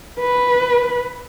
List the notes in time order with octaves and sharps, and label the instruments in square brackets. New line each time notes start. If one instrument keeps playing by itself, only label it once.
[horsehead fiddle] B4